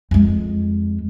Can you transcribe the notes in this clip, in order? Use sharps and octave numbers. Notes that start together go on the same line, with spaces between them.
F2 G#3